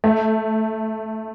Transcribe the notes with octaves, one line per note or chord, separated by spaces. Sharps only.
A3